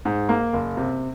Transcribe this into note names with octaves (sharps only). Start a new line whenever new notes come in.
G#2
A#3
F#1
C3